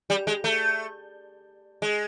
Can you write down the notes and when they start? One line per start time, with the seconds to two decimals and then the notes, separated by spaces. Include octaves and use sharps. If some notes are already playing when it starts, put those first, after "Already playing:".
0.10 G3
0.27 G#3
0.44 A3
1.82 G#3